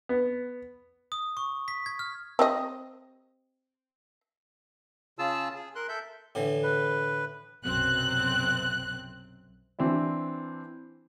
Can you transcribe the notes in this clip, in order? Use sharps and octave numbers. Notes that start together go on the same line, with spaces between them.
B3
D#6
C#6
B6
G#6
F6
C4 G4 D#5
C#3 F4 G#4 A5 E6
G#4
A#4 C6 F#6
A4 E5 G6
A2 D3 E3
B4
B1 F#2 C3 C4 F#6
E3 C4 D4 E4